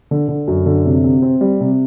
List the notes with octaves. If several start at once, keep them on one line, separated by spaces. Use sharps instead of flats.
D3
D3
F#2
D3
C3
C3
C4
G3
C3